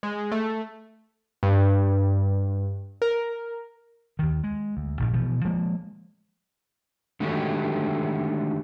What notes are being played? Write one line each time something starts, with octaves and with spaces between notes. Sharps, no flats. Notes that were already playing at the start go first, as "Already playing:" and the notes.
G#3
A3
G2
A#4
D#2 D#3
G#3
D2
A#1 G#2
B2 E3 F3
F3 G#3 A#3
D3 D#3 G#3 A3 F#4 G4